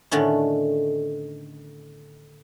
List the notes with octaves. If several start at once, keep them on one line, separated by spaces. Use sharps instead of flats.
A2 D3 D#3 A3 B3 C#4